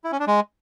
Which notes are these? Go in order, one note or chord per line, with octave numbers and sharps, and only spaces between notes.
E4
C#4
D4
G#3